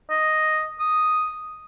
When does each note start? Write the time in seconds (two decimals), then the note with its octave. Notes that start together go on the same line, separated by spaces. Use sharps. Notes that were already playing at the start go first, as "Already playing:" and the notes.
0.10 D#5
0.80 D#6